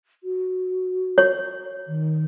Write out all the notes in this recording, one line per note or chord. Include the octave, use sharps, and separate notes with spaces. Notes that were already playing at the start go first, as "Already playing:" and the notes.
F#4
C#5
D#3